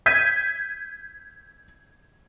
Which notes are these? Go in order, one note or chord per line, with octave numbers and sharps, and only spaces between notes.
G6 G#6 B6 D#7